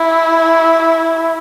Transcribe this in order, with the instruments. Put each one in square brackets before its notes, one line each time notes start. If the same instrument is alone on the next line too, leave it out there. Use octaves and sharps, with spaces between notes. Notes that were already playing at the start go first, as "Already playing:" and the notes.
Already playing: [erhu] E4